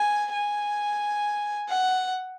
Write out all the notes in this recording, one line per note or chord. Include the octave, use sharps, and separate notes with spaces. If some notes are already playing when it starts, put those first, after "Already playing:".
Already playing: G#5
G#5
F#5